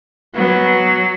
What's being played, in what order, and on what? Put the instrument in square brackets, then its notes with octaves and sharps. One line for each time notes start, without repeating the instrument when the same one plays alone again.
[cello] F#3 [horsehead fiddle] B3